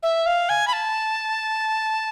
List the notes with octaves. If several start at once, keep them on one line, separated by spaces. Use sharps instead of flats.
E5
F5
G#5
B5
A5